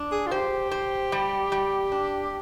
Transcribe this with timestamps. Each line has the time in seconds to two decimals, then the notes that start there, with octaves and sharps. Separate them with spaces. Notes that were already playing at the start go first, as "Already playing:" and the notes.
Already playing: D4
0.11 G#4
0.27 F4
0.31 G4 C5
0.71 C5
1.12 G3
1.52 G3
1.92 D4